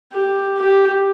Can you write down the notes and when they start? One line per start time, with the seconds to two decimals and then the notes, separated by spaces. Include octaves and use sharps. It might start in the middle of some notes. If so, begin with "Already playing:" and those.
0.14 G4
0.58 G4